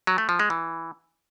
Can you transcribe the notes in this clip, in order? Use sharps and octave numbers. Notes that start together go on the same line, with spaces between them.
F#3
A3
F3
G#3
E3